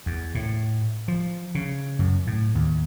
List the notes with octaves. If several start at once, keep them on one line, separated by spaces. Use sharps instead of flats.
E2
A2
F3
C#3
F#2
A2
D#2